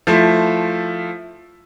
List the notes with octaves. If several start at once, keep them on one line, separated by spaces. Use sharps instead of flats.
F3 A3 E4